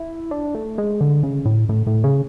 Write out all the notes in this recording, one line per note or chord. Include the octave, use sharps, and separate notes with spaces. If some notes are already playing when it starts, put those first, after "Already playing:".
Already playing: E4
D4
A3
G#3
D3
C#3
A2
A2
A2
C#3